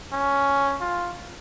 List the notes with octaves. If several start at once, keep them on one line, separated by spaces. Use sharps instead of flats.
C#4
F4